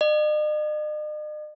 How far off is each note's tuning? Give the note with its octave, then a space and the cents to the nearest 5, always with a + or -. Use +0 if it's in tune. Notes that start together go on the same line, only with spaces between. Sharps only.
D#5 -45